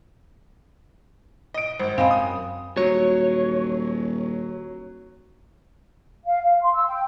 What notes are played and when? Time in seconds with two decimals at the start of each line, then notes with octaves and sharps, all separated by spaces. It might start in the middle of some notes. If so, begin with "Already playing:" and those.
1.54 D#5 D7
1.79 G#1 C5
1.98 F#2 C4 D#5 F5 G#5 B5
2.11 D#6
2.77 D#1 F#3 C#5
6.26 F5
6.42 F5
6.62 C6
6.74 E6
6.88 G5